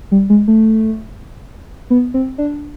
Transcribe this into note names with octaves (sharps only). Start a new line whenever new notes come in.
G3
G#3
A3
B3
C4
D4